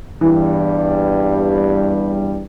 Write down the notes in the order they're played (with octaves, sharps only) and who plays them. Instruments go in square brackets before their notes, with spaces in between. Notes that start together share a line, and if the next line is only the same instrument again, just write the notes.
[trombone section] E2 G2 G3 [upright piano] E3